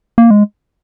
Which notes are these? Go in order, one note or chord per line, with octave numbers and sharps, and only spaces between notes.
A#3
G#3